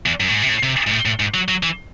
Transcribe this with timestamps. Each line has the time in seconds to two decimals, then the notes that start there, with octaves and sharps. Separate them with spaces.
0.06 E2
0.20 F#2
0.29 A2
0.34 G#2
0.42 C3
0.49 A2
0.63 C3
0.87 G#2
0.91 A2
1.06 A2
1.20 G#2
1.34 F#3
1.49 F#3
1.63 E3